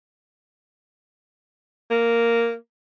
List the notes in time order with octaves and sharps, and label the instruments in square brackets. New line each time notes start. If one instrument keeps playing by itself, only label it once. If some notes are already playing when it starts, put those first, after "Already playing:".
[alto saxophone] A#3